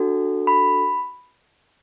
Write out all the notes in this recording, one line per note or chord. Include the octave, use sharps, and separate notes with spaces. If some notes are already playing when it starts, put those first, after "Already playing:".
Already playing: D4 F#4 A4
B5